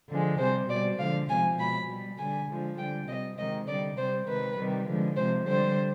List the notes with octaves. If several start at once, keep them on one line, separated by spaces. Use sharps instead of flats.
D3 F3 G#3
C3 G3 C5
B2 G3 D5
D3 F3 G#3 F5
C3 F3 G#3 G#5
B2 G#3 B5
B2 G3
D3 G3 G#5
D3 F3 G#3
D3 G3 G5
C3 G3 D#5
C3 D#3 G#3 D#5
D3 G3 D5
C3 G3 C5
C3 D#3 G#3 B4
C3 D#3 G3
D3 F3 G#3
C3 F3 G#3 C5
D3 G3 C5